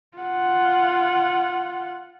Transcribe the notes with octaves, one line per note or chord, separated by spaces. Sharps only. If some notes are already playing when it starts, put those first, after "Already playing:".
F4 F#5